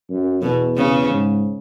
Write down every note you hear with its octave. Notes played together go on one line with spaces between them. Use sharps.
F#2
E2 B2
C#3
G#2